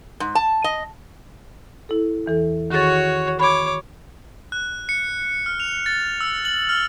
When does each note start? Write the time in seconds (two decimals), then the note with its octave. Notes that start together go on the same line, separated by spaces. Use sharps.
0.20 G#2
0.35 A5
0.64 D#5
1.89 E4 A4
2.26 E2 E3 A4
2.70 D#3 F#4 G#4 C#5 A6
3.40 C#5 B5 D6 G#6
4.52 F#6
4.89 C#7
5.46 F6
5.60 F7
5.86 A6
6.21 E6
6.45 F#7
6.69 F6